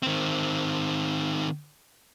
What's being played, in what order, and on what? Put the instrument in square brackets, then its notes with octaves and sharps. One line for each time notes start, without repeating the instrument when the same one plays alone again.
[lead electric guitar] D#3 C4